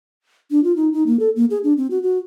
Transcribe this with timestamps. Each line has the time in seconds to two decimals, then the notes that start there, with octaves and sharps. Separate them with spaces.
0.51 D4
0.64 F4
0.76 D#4
0.92 D#4
1.07 A#3
1.20 A4
1.36 A#3
1.50 G#4
1.64 D4
1.77 C4
1.91 F#4
2.03 F#4